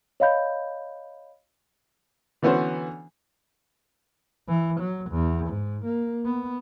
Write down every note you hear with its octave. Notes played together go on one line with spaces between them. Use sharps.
C#5 D#5 F5 B5 G6
D3 E3 B3 C#4 F#4 C5
E3
F#3
E2
G#2
A#3
B3